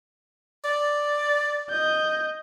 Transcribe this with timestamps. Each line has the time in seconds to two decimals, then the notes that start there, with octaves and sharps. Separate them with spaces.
0.64 D5
1.70 D#5 G6